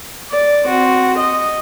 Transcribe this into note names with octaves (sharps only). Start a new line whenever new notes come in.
D5
C4 F#4
D#5